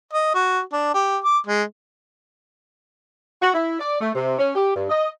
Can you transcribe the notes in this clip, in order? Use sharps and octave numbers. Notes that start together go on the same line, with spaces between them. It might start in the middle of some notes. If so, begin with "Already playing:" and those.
D#5
F#4
D4
G4
D6
G#3
F#4
E4
D5
A3
C3
C#4
G4
G2
D#5